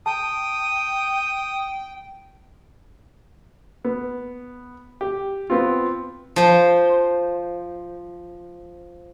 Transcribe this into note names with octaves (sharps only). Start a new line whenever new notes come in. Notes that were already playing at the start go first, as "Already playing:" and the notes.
G5 A5 D#6
B3
G4
B3 C4 F4
F3 C5